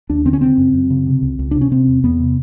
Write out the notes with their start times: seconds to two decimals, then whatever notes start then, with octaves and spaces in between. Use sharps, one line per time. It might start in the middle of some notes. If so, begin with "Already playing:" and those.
0.10 D#2 D4
0.25 D3 C4
0.33 C#4
0.41 C#3 C4
0.58 F#2
0.74 F#2
0.90 C#3
1.07 C3
1.22 C#2
1.39 C#2
1.51 C3 D4
1.61 C#4
1.71 C3 C4
1.88 E2
2.04 E2 B3
2.20 C3